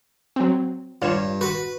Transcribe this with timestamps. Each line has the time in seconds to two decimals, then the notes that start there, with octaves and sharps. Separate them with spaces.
0.36 F#3 C4
1.02 G2 F4 C#5 E7
1.41 F#4 B4